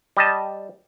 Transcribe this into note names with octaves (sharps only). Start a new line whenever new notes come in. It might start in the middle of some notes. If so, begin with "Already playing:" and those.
G3 D#5 A5